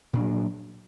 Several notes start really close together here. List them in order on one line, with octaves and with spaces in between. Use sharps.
A#2 D4 F#3